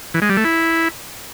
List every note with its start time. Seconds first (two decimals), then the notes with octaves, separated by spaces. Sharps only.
0.14 E3
0.22 G#3
0.29 G3
0.37 A3
0.44 E4